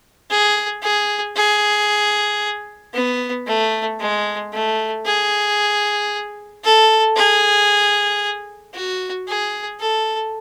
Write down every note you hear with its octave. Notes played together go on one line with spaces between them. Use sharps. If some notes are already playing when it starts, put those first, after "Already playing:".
G#4
G#4
G#4
B3
A3
G#3
A3
G#4
A4
G#4
F#4
G#4
A4